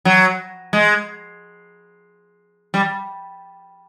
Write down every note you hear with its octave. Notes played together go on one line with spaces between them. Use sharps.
F#3
G#3
G3